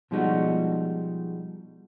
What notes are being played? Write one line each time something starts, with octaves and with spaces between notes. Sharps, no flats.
B2 F3 G3 G#3 D#4 F#4